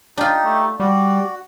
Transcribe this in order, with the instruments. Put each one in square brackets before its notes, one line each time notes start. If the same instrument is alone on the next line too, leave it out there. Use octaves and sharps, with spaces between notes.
[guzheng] D4 F4 [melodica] D#4 G4
[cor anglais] A3
[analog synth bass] G3 [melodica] F#4 [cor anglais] D5